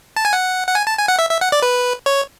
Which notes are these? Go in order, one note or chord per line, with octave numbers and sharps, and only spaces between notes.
A5
G#5
F#5
F#5
G#5
A5
G#5
F#5
E5
E5
F#5
D5
B4
C#5